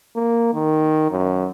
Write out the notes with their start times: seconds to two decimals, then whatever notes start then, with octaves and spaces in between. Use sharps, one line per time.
0.16 A#3
0.54 D#3
1.11 F#2